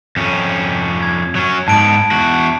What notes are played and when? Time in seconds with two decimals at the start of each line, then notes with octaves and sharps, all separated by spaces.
0.17 F2 C#4
1.03 G#6
1.35 F#3 C#4
1.68 G#2 B3 A5 D7
2.11 E2 F#4